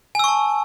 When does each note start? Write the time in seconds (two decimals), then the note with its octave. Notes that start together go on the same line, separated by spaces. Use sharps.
0.15 G#5
0.19 E6
0.24 C#6
0.28 A5